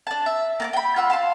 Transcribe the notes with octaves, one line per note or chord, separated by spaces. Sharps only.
D4 A5
E5
A#3 A5 D6
G5 B5
F4 F#5 E6
F5 A5 C6